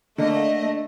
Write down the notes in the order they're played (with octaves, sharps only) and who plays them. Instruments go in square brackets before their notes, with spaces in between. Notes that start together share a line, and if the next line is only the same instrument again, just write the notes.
[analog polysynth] D3 A#3 [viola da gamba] A3 [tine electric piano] D4 [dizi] D#5